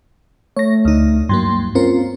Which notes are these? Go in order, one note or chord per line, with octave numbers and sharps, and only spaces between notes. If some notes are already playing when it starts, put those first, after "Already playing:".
A3 C#5 A#6
D2 D#4
G2 F#3 A#3 C6
C4 C#4 F4 A#4